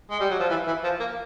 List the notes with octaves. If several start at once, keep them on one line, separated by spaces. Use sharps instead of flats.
G#3
G3
F#3
F3
E3
E3
F3
A#3